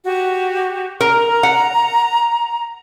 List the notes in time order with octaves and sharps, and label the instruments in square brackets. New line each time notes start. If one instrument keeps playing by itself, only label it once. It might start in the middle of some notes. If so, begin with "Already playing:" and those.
[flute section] F#4 G4
[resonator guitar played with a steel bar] A#4 [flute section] A#5
[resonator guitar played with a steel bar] F#5